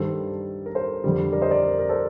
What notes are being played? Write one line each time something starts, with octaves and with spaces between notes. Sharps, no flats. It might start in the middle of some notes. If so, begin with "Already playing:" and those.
Already playing: G2 D#3 G3 A4 C5
A#4
A4 C5
F2 D3 G3
A#4 D5
C5 D#5
A#4 D5
A#4
A4 C5